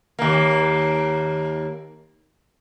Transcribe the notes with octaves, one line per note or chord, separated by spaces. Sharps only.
D#2 A#3